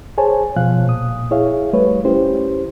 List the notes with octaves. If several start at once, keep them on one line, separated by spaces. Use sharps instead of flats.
G#4 C5 C#5 G#5 A5
B2 F3 F5 F#6
A#2 D#6
E4 G#4 C#5 E5 F5
G3 A3 B4 C#5
C#4 E4 G4 C5